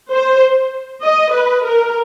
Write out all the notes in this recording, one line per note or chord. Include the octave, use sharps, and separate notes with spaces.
C5
D#5
B4
A#4